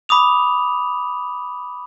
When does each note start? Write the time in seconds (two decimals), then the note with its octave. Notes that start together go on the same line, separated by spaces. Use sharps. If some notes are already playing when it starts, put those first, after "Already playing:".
0.09 B5 D6 D#6 F7